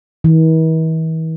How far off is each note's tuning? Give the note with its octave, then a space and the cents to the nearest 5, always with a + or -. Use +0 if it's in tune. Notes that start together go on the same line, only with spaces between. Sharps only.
E3 -45